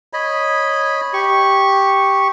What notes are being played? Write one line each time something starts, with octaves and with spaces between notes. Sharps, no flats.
C#5 D#5 B5
G4 C#6